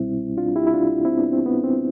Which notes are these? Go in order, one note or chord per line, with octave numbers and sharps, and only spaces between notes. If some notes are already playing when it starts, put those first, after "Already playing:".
Already playing: C2 B2 G3 C4 E4
D4 F4
E4 G4
E4
D4 F4
C4 E4
B3 D4
C4
B3
C4